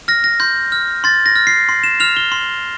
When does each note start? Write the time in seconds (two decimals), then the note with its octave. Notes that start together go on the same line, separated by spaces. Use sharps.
0.08 F6 A#6
0.24 A#6
0.40 C6 G6
0.72 F6
1.04 C6 A6
1.26 A#6
1.36 F6
1.47 C7
1.69 C6
1.84 E7
2.00 F6 F7
2.17 G7
2.32 C6